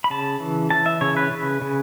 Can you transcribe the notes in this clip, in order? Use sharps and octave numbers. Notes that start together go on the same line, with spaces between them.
B5
C#3 A5
E3
E3 A5
E5
C#3 C#5
B4
C#3
C#3